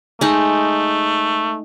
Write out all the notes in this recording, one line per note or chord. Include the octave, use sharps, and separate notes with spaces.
G#3 A3 D#4